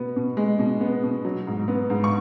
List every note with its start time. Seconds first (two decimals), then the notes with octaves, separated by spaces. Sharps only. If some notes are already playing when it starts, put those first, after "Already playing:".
Already playing: B2 B3
0.16 B2
0.37 G#3
0.59 B2
0.81 B3
1.03 B2
1.25 F#3
1.47 G#2
1.68 B3
1.90 G#2
2.04 C#6